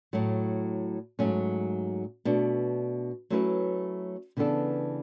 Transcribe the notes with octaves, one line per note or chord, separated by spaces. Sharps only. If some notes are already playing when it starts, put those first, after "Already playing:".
A2 F#3 A3
G#2 F#3 A3 C#4
B2 A3 D4
F#3 A3 C#4 E4 B4
C#3 E3 B3 D4 A4